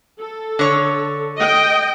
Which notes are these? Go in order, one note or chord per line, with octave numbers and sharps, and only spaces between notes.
A4
D3 C#5
D#5 G5